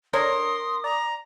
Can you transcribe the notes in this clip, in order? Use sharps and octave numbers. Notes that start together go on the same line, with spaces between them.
D4 A#4 C#5 C6 D#6 A#6
D5 A#5